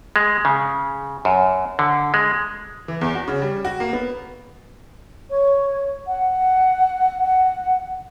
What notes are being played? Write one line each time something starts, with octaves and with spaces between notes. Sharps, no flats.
G#3
C#3
F#2
D3
G#3
E3
E2
F#4
C#3
G3
F#4
A#3
B3
C#5
F#5
F#5